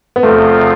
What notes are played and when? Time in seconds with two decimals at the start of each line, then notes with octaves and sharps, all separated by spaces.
0.16 B3
0.23 E2 C3 F3 A3 C4 F4